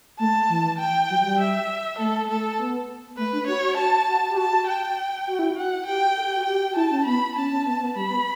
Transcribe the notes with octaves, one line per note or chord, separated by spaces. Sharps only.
A3 A5
E3
G5
F#3
G3
E5
A3 A4
A3 A4
B3
A3 B4
D4
F#4 C#5
F#4
A5
F#4
G4
F#4 A5
G5
F#4
E4
F#4
F#5
G4 G5
A4
G4
F#4
G4 G5
F#4
E4 A5
C#4
B3 B5
C#4 A5
C#4
B3
B3
G3 B5
B3